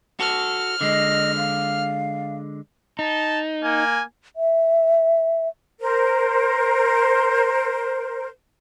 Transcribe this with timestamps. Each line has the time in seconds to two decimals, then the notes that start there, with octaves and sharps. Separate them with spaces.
0.20 F#4 A4 F6
0.81 D3 G#3 D#5
1.37 F5
2.99 D#4 A5
3.64 A#3 G#5
4.36 E5
5.81 A#4 C5